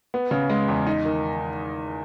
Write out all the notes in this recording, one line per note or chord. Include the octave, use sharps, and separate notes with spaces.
B3
C#3
G#3
E2
D#4
D#3